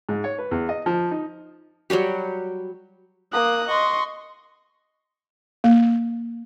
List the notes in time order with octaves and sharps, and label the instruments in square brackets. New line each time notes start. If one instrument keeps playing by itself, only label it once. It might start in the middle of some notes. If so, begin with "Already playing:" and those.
[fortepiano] G#2
C#5
B4
E2
D#5
F3
D#4
[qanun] F#3 G3 F#4 G4
[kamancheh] A#3 [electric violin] D#6 F#6
[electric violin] D#5 [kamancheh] C6 C#6
[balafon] A#3